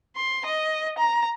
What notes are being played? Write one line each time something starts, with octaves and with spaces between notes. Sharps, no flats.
C6
D#5
A#5